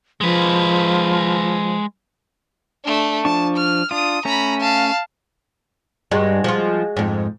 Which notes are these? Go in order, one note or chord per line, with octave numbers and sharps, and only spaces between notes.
F3 G#3 B4
A3 D4
F3 D4 A5 C#6
F6
D4 F4 D#6
A3 C#4 A#5 B5
F5 A5
G2 G#3 F#4
F3 F4
F2 G#2